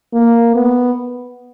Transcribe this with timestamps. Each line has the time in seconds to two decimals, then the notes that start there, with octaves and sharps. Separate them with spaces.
0.14 A#3
0.55 B3